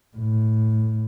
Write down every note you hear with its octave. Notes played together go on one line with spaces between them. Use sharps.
A2